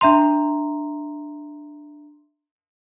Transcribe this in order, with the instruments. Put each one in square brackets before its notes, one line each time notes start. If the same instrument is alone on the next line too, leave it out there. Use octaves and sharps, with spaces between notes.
[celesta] D4 E5 A#5 C6